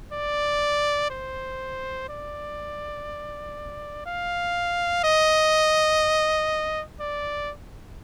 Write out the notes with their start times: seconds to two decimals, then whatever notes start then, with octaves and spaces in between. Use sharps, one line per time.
0.12 D5
1.10 C5
2.09 D5
4.06 F5
5.04 D#5
7.00 D5